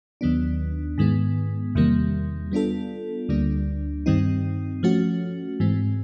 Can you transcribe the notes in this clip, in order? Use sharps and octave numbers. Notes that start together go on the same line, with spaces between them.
D#2 D#3 F#3 B3 D4
G#2 D#3 G#3 B3
E2 C3 D#3 G3 A#3
G3 B3 D4 F4 A4
D2 D3 G3 A#3 D4
G2 D#3 G3 C4 D#4
F3 A3 C#4 F#4
G#2 E3 G#3 C4